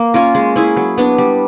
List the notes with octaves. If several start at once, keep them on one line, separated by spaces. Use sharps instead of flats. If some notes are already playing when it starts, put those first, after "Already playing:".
Already playing: A#3
C#4 F4 A#4
G#3
C#4 E4 G#4
F#3
B3 D4
G3